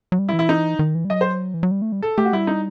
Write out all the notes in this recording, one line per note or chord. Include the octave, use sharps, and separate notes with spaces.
F#3
G3
E4
E3
E4
D#4
D#3
E3
G3
F#3 D#5
C5
E3
F#3
G3
A3
G3
A4
A3 G4
F#4
G3 E4
D#4